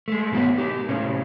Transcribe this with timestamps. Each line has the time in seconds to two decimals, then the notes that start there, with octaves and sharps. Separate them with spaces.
0.08 G#3 A3
0.32 G#2 B2 D#3 F#3 B3 E5
0.58 D#4 G4
0.89 A2 C3 C#4